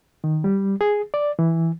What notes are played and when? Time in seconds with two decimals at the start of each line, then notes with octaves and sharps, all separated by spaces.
0.24 D#3
0.44 G3
0.81 G#4
1.14 D5
1.39 E3